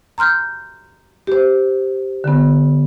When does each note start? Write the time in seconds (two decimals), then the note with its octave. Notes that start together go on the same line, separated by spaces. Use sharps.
0.18 A#5 C6 F6 G6
1.27 G4 C5
2.24 D3 B3